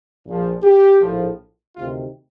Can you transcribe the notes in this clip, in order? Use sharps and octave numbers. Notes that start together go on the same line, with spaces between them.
A#1 A#2 F3
G4
A#1 A2 F3
D2 C3 D#3 F4